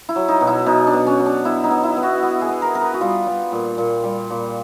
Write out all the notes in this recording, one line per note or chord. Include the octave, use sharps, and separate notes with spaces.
E4
F#3
D#4
B2
E4
B2 D#4
D4
B2
C#4
F#3
D4
B3 E4
D#4
B3
E4
B3
F#4
B3
G#4
B3
A#4
B3 A#4
B4
F#4
G3 F4
G3
A#2
A#2
G3
A#2